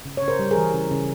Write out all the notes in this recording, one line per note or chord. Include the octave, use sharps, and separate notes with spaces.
C#3
C#3 C#5
A#4 C5
G3
G#4 A#4
E3
C#3
C#3